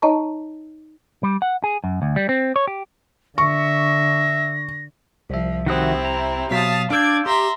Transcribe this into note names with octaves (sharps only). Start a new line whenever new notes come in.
D#4 C#5 D#5 A5 A#5 C#6
G3
F#5
G#4
F#2
D2
G3
C4
C#5
G4
D3 E5 C#6 A#6
C2 F3 E5
C3 D#3 C4 E4 F#4 D#6
A#5
B2 F#3 F5 A5 D#6 B6
D4 D5 F5 D6 E6 G6 G#6
G4 E5 A#5 C6